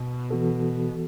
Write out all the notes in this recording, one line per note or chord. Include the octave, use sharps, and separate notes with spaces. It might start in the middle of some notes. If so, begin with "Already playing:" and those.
Already playing: B2
E3 B3 F#4 A4